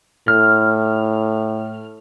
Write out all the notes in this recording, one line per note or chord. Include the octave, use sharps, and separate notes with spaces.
A2 F6